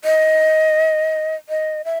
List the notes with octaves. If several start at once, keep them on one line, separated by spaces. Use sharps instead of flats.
D#5
D#5
E5